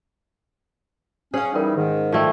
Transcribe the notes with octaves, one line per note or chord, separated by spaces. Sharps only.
C#4 G#4 C5 F5
E3 G3 C#4 D#4 A#4
G#2 D#3
F3 A3 A4 D5 G5